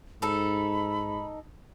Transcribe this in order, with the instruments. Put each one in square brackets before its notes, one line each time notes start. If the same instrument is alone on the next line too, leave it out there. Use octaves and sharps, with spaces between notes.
[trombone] G#2 [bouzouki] D#4 A4 [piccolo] B5